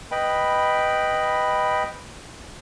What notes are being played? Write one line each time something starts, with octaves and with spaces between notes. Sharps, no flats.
B4 D#5 G5 B5